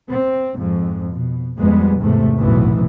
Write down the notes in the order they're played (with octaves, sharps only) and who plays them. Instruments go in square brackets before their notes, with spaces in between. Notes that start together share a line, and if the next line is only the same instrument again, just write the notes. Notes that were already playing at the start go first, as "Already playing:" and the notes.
[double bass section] C4
F2 G#2
B2
F2 G3 G#3 B3
E2 G#2 C3 A3
F1 B1 F#2 A2 E3 B3